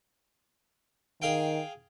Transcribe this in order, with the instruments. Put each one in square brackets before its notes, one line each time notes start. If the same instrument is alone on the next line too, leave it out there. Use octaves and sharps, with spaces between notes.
[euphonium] D#3 [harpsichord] G#4 F5 G5